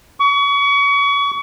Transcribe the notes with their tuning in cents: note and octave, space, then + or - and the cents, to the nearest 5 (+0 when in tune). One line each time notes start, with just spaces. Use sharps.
C#6 +35